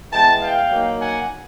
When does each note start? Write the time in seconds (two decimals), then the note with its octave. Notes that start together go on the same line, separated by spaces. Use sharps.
0.12 E3 G#3 B3 G5 A5
0.41 F5 G5
0.71 F#3 A#3 D#4
1.00 F#5 G#5